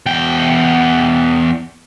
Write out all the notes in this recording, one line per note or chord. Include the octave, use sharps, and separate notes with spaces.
E2 G5